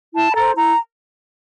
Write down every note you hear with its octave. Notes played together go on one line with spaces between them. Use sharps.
E4 A5
B5
A4 C5 A#5
E4 A#5